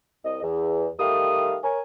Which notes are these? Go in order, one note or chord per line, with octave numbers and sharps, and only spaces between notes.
C2 D#5
E2
D#3 G3 A3 F5 D#6
A#4 C#5 G#5